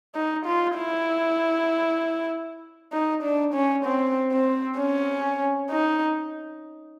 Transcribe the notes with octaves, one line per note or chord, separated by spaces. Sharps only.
D#4
F4
E4
D#4
D4
C#4
C4
C4
C#4
D#4